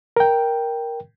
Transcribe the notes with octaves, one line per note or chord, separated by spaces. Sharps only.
A#4 G5